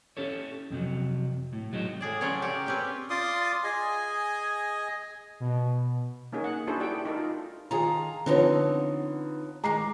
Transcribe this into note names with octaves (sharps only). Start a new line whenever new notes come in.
C#4 G4 A4 C#5
F2 C3 F#3
A2
F#3 G#3 C4 D#4
A2 G#4 D5
C#3 F3 F#3 C#5 D5
G4 A#4 D5
C4 C#4 G4 B4 G5
F4 D5 C6 D#6
G#4 D#5 G#5
B2
A#3 C#4 D#4 G#4
F#5
D4 E4 F#4 G#4 A4 C5
E4 G4 D5 G5
D#4 A4 A#4
F4
D#3 F4 G#4 A5 A#5
D3 F3 B3 C4 D#4 C#5
D#3 G#3 A#5 D6 C7